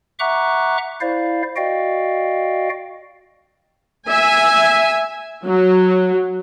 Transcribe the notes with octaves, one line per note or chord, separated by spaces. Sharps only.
E5 F#5 A#5 C#6 D6 F#6
E4 C5 D5 F5
F#4 D5 D#5 F5 G5
E5 G#5
F#3